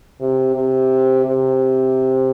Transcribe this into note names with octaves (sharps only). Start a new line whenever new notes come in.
C3
C3
C3